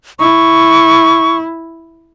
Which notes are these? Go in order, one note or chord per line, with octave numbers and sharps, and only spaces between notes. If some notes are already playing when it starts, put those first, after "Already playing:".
E4 C#6